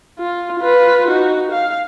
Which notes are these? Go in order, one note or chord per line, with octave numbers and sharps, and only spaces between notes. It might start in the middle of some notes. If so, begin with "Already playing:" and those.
F4
F4 B4
D#4 F#4
F5